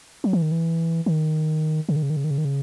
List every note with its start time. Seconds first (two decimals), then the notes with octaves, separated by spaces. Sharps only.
0.24 F#3
0.33 E3
0.42 D#3
0.52 E3
1.06 D#3
1.89 C#3
1.96 D#3
2.03 C#3
2.10 D#3
2.16 C#3
2.24 D#3
2.31 C#3
2.38 D#3
2.45 C#3